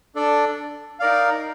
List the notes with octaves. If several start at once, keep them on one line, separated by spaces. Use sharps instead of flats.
D4 A4 D5
D#4 A#4 D5 F5